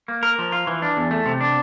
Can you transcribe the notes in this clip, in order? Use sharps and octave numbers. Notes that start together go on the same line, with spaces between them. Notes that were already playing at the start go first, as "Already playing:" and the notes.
A#3
A#4
F3
F4
E3
D4
E2
A3
C3
D4